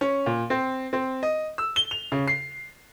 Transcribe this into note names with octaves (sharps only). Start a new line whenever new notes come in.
C#4
A#2
C4
C4
D#5
E6
G7
F7
C#3
C7